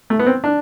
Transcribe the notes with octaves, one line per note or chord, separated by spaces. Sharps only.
A3
B3
C4
D4